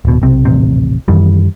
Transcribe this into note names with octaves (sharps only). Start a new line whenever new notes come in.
D1 B2
B1 C3 C4
D#1 A1 C3
F#2 D#3 E3 G3